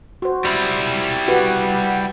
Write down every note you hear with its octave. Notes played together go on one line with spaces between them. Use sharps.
F#4 C5
G3 E4
F#4 G4 B4 F#5